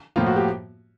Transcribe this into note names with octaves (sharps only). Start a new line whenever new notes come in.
A2 F3 A#3 F4
F#4
G4